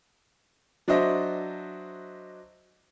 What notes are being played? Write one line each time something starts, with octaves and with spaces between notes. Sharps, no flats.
F#3 D4 F#4 C5 D#5 E5